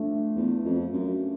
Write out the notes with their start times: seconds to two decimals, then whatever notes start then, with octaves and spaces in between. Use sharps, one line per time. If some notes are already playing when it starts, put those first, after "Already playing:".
Already playing: F3 A3 D4 F4
0.36 E2
0.65 F2
0.93 F#2